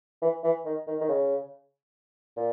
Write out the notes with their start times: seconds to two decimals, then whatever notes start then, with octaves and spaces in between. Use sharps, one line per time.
0.22 E3
0.44 E3
0.65 D#3
0.87 D#3
1.01 D#3
1.09 C#3
2.37 A#2